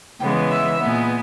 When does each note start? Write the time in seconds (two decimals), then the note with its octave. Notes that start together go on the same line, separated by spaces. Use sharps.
0.20 C#3 E3 G#3 B3 G5
0.50 E5
0.78 A#2 G#3 B3